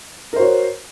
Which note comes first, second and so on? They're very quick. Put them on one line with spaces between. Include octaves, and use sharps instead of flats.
A#4 C5 F#4 C#5